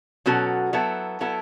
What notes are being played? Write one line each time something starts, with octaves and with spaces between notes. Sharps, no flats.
B2 F#3 C#4 F#4 A4
F#3 B3 E4 A4
F#3 B3 E4 A4